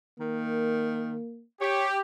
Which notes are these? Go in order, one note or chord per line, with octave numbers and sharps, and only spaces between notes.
D#3 A#3
G4 C#5